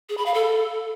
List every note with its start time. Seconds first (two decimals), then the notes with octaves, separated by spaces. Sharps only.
0.09 G#4
0.18 B5
0.26 F5
0.34 A4